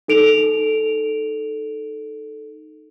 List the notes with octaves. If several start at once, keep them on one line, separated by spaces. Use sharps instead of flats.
D#4 A4 D7 F7